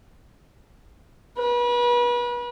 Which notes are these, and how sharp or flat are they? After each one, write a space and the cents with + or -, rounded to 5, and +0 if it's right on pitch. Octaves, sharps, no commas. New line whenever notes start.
B4 -35